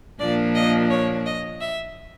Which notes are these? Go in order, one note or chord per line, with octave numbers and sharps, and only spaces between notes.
A#2 F3 A#3 D4 D5
D#5
C#5
D#5
E5